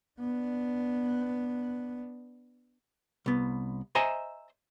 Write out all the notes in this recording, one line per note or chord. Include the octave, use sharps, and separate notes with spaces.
B3 D4
C2 B3
C5 D#5 E5 G#5 A#5